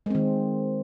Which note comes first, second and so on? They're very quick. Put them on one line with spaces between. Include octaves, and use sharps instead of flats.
G#3 C4 D#3